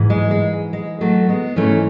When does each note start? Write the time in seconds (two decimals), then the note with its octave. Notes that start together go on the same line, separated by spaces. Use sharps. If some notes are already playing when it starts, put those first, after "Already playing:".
Already playing: G#2 E3
0.10 G#3
0.31 G#3
0.73 G#3
1.01 F#3 A3
1.29 G#3 B3
1.56 G#2 E3 A3 C#4